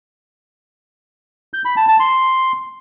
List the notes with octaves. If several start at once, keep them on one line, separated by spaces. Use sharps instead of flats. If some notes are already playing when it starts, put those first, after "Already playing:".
G6
B5
A5
A5
C6